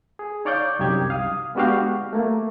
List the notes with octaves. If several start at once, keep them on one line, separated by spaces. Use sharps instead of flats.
G#4
D#4 C#5 D5 F5 G6
C2 F#2 D#4 G4 G#6
F5 D#6
G#3 B3 D4 F#4 G4 F5
A3 A#3